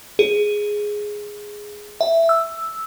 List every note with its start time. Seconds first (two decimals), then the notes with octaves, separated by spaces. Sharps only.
0.19 G#4
2.01 E5
2.29 E6